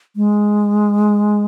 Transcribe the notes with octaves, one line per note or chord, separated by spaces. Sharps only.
G#3